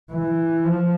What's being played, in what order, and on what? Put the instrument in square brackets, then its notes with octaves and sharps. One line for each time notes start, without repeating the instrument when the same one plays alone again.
[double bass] E3
F3